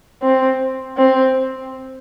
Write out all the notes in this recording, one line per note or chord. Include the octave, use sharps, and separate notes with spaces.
C4
C4